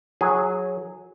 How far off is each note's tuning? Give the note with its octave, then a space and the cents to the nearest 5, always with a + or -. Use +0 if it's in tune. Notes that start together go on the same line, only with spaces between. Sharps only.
F#3 -15 G#4 +0